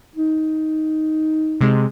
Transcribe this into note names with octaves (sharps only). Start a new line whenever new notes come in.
D#4
C3 G#3